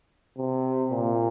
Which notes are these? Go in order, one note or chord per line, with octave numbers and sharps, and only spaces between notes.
C3
A#2